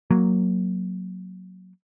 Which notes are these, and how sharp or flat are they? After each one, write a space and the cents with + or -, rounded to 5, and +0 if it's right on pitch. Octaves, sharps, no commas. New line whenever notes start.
F#3 +0 A#3 +0